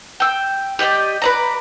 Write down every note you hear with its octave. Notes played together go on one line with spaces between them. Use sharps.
G5 E6
G4 D5 D#5 G5
B4 D5 A#5